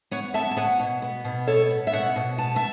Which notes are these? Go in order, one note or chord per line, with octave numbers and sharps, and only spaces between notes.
B3 C#5 F#5
B3 E5 A5
A5
B3 C#5 F#5
B2
B3
B2
B3 A4 C#5
B3
E5
B2 C#5 F#5
B2
B3 A5
E5 A5